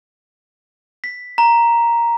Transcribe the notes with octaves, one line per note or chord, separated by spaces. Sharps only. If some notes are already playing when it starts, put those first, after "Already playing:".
B6
A#5